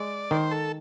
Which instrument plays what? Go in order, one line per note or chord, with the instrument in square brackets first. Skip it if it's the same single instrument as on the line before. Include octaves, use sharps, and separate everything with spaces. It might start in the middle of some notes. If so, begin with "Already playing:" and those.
Already playing: [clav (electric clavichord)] G#3 [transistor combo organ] D5
[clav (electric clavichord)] D#3 [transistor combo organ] C5
[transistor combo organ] A4